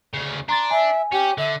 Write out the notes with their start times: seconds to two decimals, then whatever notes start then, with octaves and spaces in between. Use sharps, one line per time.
0.14 D2 C#3
0.49 D4 A#5 C6 A6
0.70 E5 G#5
1.12 C#4 G4
1.38 D3 E5